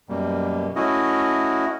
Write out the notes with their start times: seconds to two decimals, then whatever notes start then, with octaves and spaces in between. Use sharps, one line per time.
0.09 F#2 B2 G3 A#3
0.76 A3 C#4 E4 F#4 D#5